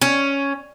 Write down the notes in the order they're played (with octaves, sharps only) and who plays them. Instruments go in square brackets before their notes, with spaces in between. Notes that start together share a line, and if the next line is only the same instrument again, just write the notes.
[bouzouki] C#4